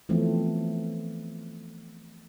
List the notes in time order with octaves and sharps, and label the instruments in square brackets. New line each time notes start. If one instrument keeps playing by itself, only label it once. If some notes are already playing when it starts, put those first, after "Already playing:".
[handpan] E3 F3 A3 B3 C4